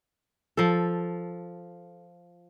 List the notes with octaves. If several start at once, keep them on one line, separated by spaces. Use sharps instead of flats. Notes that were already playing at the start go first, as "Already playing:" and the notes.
F3 A4